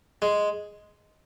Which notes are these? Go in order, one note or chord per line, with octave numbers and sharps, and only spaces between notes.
G#3